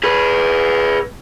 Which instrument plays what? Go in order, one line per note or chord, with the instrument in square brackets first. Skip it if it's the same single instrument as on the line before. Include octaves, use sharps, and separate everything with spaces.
[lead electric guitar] G#4 B4